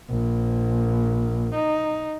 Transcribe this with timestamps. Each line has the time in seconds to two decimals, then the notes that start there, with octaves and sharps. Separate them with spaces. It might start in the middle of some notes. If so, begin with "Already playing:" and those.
0.10 A#1
1.55 D#4